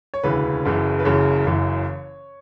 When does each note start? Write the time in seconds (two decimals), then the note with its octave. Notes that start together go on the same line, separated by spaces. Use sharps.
0.14 C#5
0.23 E1 D2 C#3 E3 B4
0.65 F#1 F#2 C#3 E3
0.99 B4
1.05 F#1 F#2 C#3 E3 C#5
1.46 F#1 F#2 C#3 E3